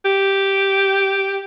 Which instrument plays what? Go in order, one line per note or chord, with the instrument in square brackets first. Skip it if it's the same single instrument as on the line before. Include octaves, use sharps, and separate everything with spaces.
[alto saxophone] G4